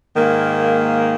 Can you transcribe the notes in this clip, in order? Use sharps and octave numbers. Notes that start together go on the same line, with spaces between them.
G#2 D#3 A#3